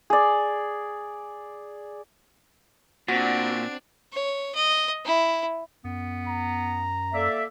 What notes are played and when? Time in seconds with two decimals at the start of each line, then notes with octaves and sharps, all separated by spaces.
0.10 G#4 D5
3.08 A#2 C4 D4 F#4
4.12 C#5
4.54 D#5
5.05 E4
5.84 F#2 B3
6.27 A#5
7.13 A#3 A4 D5 E5